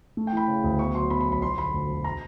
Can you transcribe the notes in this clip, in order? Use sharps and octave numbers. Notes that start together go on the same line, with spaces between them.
A3
G5
E3 B5
C#3
D2
B3 C#6
F#3 C6
B2 B5
B5
B1
B5
F3 C6
D3 B5
D2
E1
A#5